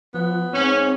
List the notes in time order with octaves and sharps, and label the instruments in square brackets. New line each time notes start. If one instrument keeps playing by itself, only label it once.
[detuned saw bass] F3 [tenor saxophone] B3
[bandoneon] G#2 C#5 [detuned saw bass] C4 [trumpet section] C#4